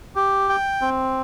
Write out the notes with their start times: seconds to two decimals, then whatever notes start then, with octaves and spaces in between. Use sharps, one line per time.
0.16 G4
0.49 G5
0.82 C4